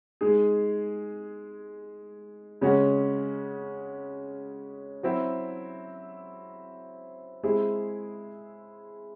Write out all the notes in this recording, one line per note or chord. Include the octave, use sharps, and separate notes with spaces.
G#3 D#4 G#4
C#3 G#3 C#4 F#4
F#3 C4 E4
G#3 C4 E4 G#4